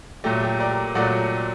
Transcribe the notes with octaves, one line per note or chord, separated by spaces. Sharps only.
A#2 F#3 A3 G4
G4
A#4 D5
A#2 F#3 A3 D5 F#5